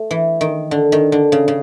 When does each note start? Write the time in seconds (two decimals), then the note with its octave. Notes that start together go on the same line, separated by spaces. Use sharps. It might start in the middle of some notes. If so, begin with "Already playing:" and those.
Already playing: A3
0.11 E3
0.41 D#3
0.71 D3
0.92 D#3
1.12 D3
1.32 C#3
1.48 C#3